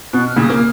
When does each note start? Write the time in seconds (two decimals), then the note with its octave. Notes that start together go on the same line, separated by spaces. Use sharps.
0.13 B2 F#6
0.28 F6
0.36 A#2 C#3
0.40 D#6
0.50 A#3 F6